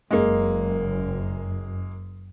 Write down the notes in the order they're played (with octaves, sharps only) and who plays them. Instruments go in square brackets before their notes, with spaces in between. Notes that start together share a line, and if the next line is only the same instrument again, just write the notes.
[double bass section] F#1 F#2 [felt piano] G#3 A#3